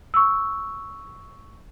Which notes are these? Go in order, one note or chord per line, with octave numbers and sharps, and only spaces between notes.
C#6 E6